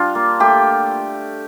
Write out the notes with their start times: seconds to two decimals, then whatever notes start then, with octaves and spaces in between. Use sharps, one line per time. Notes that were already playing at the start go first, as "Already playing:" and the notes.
Already playing: G3 D4 F4
0.15 A#3
0.40 A3 G4